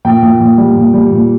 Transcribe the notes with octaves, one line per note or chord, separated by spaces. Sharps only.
A#2 G5
A#2
A#2
G3
A#2
G3
A#2